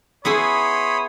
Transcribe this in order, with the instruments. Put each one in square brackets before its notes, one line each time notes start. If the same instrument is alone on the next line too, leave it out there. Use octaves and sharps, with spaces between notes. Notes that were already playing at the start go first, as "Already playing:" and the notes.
[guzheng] B3 E4 G#4 [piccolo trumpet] C#5 [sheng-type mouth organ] B5 C6 D#6